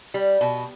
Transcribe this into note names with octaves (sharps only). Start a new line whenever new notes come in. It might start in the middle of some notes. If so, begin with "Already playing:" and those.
G3
B2